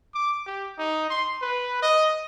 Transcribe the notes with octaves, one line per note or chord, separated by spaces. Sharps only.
D6
G4
D#4
C6
B4
D#5